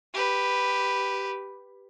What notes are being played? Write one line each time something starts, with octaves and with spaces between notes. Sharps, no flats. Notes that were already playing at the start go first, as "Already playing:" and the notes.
G4 B4